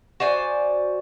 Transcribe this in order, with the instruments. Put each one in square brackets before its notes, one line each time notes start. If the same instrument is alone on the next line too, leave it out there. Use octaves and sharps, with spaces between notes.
[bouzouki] F#4 C5 D5 G#5